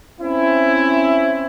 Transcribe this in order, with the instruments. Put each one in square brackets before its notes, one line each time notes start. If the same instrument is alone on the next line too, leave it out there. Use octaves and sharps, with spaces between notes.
[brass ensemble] C4 C#4 E4